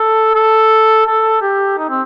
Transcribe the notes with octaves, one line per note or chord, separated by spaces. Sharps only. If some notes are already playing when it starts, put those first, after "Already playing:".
Already playing: A4
A4
A4
G4
D#4
C4